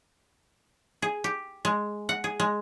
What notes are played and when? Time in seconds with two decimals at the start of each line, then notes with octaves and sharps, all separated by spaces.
1.02 G#4
1.24 G4
1.65 G#3
2.09 F#5
2.24 G#4
2.40 G#3